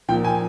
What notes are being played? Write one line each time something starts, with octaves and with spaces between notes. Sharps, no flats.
A#2 F3 G5
G#5